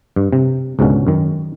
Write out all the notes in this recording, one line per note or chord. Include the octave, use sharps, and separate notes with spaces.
G2
C3
C#2 G#2 B2 D3 C#4
F#2 D#3